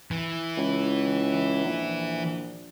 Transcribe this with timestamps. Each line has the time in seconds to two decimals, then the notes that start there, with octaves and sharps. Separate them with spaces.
0.11 E3
0.57 C#2
1.65 A#1